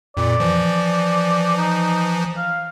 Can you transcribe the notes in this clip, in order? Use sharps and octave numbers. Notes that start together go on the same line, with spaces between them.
F2 A#2 D5
E3 F3
D#4
F5